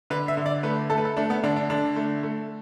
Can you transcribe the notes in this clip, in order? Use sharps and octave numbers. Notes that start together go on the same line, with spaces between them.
D3 B4
E5
D3
D5
A3 B4
A3 A4
B4
A4
A3 D4
B3
D3 D4
D4
D3 D4
A3
A3